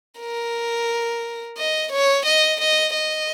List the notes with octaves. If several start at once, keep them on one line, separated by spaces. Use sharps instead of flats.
A#4
D#5
C#5
D#5
D#5
D#5